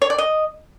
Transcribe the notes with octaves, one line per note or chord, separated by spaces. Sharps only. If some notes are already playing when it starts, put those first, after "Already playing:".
C#5
D5
D#5